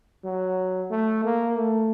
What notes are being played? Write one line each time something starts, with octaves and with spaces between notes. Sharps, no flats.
F#3
A3
A#3
A3